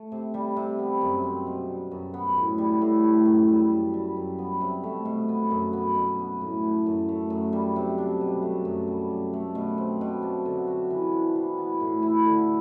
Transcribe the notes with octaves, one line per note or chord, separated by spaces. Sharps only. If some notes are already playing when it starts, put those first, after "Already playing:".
Already playing: A3
C3
G3
C3
B3
F#2
C4
B2
G3
F#2
B3
A2
G3
A2
A3
F#2
G3
F#2
G3
F#2
B3
C3
A3
B2
B3
F#2
B3
B2
B3
A2
A3
F#2
A3
F#2
G3
C3
D4
B2
A3
F#2
G3
F#2
A3
B2
C4
B2
D4
D3
F#4
E3
D4
E3
B3
A2
E4
D3